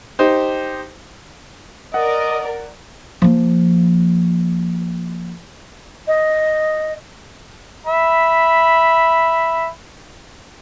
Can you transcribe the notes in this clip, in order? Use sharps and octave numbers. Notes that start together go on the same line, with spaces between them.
D#4 G4 C5
A#4 D5 D#5 F#5
F3 A#3
D#5
E5 B5